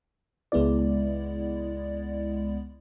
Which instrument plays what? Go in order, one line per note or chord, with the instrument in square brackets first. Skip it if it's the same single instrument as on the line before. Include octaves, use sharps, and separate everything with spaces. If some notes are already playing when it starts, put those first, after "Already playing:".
[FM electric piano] C#2 G#3 B3 E4 D5